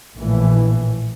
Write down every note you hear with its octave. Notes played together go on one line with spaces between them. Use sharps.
A#1 A2 E3